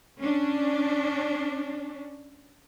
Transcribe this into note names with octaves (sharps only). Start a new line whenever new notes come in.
C#4 D4